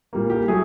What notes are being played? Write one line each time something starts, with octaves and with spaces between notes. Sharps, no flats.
A#2 G3 A#3
G4
F#3 A3 G#4